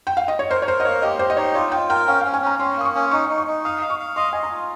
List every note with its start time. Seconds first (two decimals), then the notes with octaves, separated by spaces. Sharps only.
0.07 G5
0.17 F5
0.28 D#5
0.39 C#5
0.50 A#4 C5
0.62 C#5
0.67 A#4 C5
0.80 D#5
0.85 A#3 C#5
1.02 G4 D#5
1.19 G4 C5
1.30 D#5
1.37 D#4 C#5
1.55 F4 C#5
1.72 F4 G5
1.89 A#4 G5
2.07 C#4 F5
2.21 F5
2.25 C#4
2.34 G#5
2.42 C#4 A#5
2.59 C#4 C6
2.77 A#3 D#6
2.85 C#6
2.95 C#4
3.11 D#4 C#6
3.29 D#4
3.38 C#6
3.47 D#4
3.65 F5 D#6
3.82 F5
3.90 C#6
4.00 F5
4.16 D#5 C6
4.33 D#5 G#5
4.43 A#5
4.51 F4